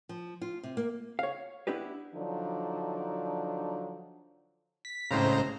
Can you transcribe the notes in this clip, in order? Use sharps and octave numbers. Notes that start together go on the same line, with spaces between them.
F3
F4
C3
A#3
C#5 F5
B3 D4 E4 G4 B4
D3 F3 F#3 D4 D#4
B6
A2 C#3 G#3 C4 C5 A#5